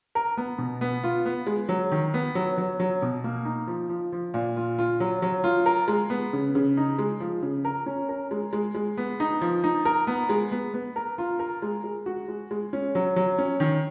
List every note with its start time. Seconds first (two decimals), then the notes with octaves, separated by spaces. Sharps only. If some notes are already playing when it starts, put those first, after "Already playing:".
0.15 A#4
0.37 B3
0.58 B2
0.81 B3
1.04 F4
1.25 B3
1.47 G#3
1.69 F#3
1.92 D#3
2.14 B3
2.35 F#3
2.58 F#3
2.80 F#3
3.02 B2
3.24 A#3
3.45 D#4
3.67 F3
3.89 F3
4.12 F3
4.34 A#2
4.56 F4
4.79 F4
5.00 F#3
5.22 F#3
5.44 F4
5.66 A#4
5.88 G#3
6.10 B3
6.33 C#3
6.55 C#3
6.77 D#4
6.99 G#3
7.20 F3
7.42 C#3
7.65 A#4
7.86 C#4
8.09 A#4
8.31 G#3
8.53 G#3
8.75 G#3
8.97 B3
9.20 D#4
9.42 F3
9.64 D#4
9.85 A#4
10.07 B3
10.29 G#3
10.52 B3
10.74 B3
10.96 A#4
11.18 F4
11.39 A#4
11.62 G#3
11.84 G#3
12.06 F#4
12.28 G#3
12.51 G#3
12.73 C#4
12.95 F#3
13.16 F#3
13.38 C#4
13.60 D#3